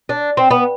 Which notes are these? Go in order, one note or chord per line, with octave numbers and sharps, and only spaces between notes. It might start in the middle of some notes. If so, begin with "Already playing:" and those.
D4
C4
B3